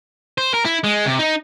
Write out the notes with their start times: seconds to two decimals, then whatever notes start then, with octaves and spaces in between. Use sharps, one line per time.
0.38 C5
0.54 A#4
0.65 E4
0.84 G#3
1.06 C3
1.19 D#4